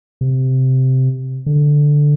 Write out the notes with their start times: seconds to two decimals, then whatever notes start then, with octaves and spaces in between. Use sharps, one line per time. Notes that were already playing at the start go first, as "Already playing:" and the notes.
0.21 C3
1.46 D3